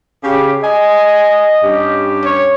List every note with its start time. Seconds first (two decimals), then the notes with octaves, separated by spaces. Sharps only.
0.23 C#3 G4
0.63 D#5 G#5
1.63 G2 C#4 G4
2.25 C#5